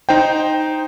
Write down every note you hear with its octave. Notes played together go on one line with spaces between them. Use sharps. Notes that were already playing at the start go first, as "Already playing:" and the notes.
D#4 C5 G5